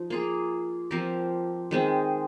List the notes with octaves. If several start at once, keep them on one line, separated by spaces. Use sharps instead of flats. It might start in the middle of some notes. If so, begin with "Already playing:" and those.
Already playing: F3 D#4
A#3 F4 G#4
F3 C4 G4 A#4
D#3 G#3 C4